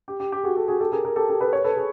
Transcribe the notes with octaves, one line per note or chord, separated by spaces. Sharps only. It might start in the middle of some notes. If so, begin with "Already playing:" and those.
G4
G4
G4
F#4 G#4
G4 A4
F#4 G#4
G4 A4
G#4 A#4
G#4 A#4
G4 A4
G4 A4
A4 B4
B4 C#5
A4 B4
G#4